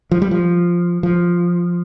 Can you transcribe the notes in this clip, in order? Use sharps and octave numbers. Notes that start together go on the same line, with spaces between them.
F3
G3
F3
F3